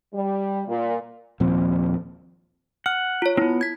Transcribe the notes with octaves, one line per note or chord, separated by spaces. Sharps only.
G3
A#2
D#1 A#2 F3 C4
F#5 F6
F4 C#5
B3 C4 E4
G#6 B6